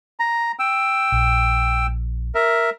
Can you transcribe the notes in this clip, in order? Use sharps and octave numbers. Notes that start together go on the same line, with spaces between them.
A#5
G5 E6
A#1
A#4 E5